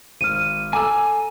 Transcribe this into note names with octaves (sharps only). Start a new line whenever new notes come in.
G#1 F6 D#7
A4 G#5 A#5 D6 E6